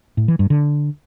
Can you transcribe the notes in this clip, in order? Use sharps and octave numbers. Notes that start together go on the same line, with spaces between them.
A2
E3
G2
D3